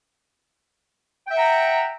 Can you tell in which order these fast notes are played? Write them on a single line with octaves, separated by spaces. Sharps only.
G5 E5 F#5 A#5